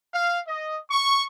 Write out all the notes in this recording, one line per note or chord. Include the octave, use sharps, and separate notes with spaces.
F5
D#5
C#6